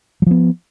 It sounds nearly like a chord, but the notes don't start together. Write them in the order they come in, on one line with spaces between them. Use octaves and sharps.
F#3 F3 B3